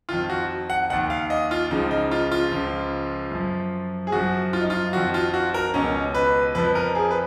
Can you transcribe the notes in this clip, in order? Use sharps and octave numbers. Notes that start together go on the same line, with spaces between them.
F2 D#3 F4
F#4
F#5
D#2 D#3 F#5
F5
D#5
F4
C#2 C#3 F3 D#4
D#4
F4
F4
C#2 C#3 F3
F#2 F3
G#4
F#2 F3 F#4
F4
D#4
F4
F2 D#3 F#4
F4
F#4
A#4
C#2 B2 C#4
B4
F2 F3 B4
A#4
G#4
B4